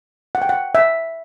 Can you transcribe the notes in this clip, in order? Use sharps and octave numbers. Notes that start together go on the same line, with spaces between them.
F#5
G5
F#5
E5